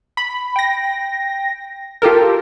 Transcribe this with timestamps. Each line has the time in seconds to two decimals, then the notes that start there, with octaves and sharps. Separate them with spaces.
0.17 B5
0.56 G5 A#6
2.02 F4 G4 A4 A#4